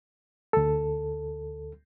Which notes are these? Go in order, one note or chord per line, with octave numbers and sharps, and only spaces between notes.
D2 A4